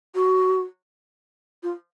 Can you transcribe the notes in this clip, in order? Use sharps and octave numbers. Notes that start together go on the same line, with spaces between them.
F#4
F4